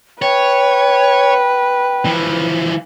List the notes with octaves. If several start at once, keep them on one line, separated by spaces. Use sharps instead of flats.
B4 C#5 G5
E3 F3